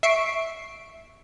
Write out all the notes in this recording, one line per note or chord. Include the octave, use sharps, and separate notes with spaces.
E5 C#6 C7 D7